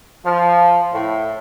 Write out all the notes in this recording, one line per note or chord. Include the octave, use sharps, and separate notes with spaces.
F3
A2